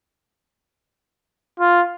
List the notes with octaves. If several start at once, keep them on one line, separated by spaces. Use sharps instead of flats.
F4